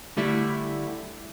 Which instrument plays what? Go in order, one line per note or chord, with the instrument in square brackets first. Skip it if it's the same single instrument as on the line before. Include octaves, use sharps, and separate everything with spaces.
[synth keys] D3 G3 A3 E4